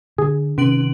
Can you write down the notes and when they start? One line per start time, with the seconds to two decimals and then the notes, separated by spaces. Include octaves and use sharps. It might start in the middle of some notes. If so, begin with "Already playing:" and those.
0.18 D3 G#4
0.58 C3 D#3 C#4 D7 F#7